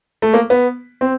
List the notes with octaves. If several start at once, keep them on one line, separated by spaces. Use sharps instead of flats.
A3
A#3
B3
C4